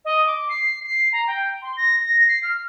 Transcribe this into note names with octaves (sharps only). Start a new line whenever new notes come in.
D#5
D6
C7
C7
A#5
G5
C6
A#6
A#6
C7
F6